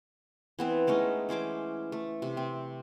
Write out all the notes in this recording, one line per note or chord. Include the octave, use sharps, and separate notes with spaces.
E3 B3 C4
G#3 A3 C#4 D#4
E3 C#4 C5 D6
A3
C3
C4